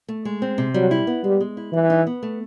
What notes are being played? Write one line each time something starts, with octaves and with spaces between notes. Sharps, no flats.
A3
G#3
C4
C3
F#3 G3
E4
B3
G3 G#3
G#3
E4
E3 G3
D#4
B3
A3